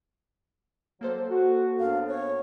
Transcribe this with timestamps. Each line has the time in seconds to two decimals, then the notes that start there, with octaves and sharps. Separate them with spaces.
1.01 F#3 A#3 A4 C5
1.30 F#4
1.79 F#2 B3 D4 F5
2.09 C#5